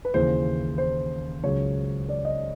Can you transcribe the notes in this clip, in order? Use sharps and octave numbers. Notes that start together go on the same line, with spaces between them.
B4
D#2 C#3 E3 C5
C5
C#2 C#3 F#3 C#5
D5
D#5